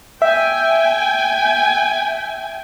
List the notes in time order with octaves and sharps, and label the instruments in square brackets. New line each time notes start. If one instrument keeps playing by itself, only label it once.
[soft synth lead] E5 [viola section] G5 G#5